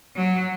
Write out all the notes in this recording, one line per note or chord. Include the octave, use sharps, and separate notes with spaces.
F#3